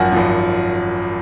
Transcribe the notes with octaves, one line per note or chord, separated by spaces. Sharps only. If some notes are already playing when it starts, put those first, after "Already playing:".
Already playing: G#1 F#2 F3 F#5 G#5
G#1 F#2 F3